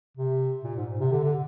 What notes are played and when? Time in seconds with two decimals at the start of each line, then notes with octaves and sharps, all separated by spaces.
0.17 C3
0.64 A#2
0.77 G#2
1.00 C3
1.12 D3
1.23 D3